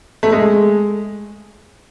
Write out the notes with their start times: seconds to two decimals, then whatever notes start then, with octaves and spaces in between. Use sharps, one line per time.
0.23 A3
0.32 G#3